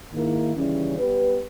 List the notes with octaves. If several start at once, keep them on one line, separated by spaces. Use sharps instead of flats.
G#2 D#3 A#3 E4 A#4
D#2 C#3 E3 G3 C#4
G3 B3 G4 B4